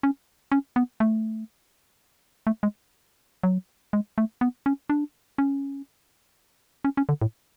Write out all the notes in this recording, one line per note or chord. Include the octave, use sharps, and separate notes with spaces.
C#4
C#4
B3
A3
A3
G#3
F#3
G#3
A3
B3
C#4
D4
C#4
C#4
C#4
D3
A2